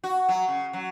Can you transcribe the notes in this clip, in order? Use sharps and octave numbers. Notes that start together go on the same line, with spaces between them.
F#4
F#3
C#3
F#3